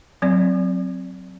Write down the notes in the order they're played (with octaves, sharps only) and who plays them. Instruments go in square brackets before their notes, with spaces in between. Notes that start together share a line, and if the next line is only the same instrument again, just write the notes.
[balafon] F#3 C4 D5